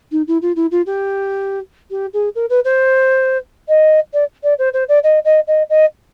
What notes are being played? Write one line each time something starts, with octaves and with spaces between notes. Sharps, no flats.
D#4
E4
F4
E4
F4
G4
G4
G#4
A#4
B4
C5
D#5
D5
D5
C5
C5
D5
D#5
D#5
D#5
D#5